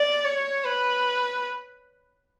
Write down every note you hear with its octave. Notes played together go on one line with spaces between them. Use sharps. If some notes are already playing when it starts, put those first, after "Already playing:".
Already playing: D5
C#5
B4